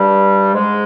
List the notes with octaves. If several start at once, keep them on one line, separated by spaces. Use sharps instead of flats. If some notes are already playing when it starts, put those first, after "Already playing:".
Already playing: G2 G3
G#2 G#3